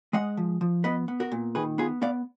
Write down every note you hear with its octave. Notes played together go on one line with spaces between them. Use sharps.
G#3 D#5 F#5
F3
F3
B3 B4 D#5
B3
F#4 A#4
A#2
D#3 G#4 B4
B3 F4 G#4
B3 D5 F5